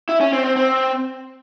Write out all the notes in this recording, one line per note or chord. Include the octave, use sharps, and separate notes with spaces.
E4
C#4
C4
C4
C4